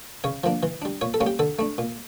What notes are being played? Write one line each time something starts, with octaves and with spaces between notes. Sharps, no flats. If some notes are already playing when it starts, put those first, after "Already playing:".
C#3 C#5
F3 A#3 D4
E3
G3 D4
A#2 C#5
A4
G3 A#3 C#4
G4
D3 A4
A3 D4
A#2